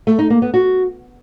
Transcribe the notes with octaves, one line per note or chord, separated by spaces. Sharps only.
A3
D#4
A#3
B3
F#4